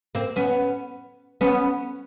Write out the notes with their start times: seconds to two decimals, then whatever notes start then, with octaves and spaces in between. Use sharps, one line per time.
0.15 A#3 C4
0.36 B3 C#4
1.41 B3 C#4